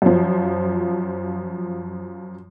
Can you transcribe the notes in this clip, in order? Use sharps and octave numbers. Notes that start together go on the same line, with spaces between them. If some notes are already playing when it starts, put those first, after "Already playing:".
F#2 F3